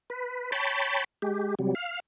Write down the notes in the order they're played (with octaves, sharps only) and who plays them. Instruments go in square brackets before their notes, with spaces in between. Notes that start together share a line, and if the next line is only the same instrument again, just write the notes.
[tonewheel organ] B4
C#5 G5 A5 B5
G#3 G4
C3 F#3 G3
F5